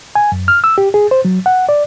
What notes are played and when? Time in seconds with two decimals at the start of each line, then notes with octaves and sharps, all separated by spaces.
0.15 G#5
0.32 F#2
0.48 F6
0.64 E6
0.78 G4
0.94 G#4
1.11 C5
1.25 F#3
1.46 F#5
1.69 D5